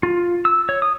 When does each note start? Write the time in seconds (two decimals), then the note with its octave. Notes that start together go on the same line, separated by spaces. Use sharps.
0.03 F4
0.45 E6
0.69 C#5
0.82 D#6